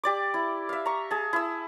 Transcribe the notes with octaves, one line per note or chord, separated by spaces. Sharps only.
G4 D5 D6
E4
E5 F5
A#5 C#6
G#4 A5
E4 E6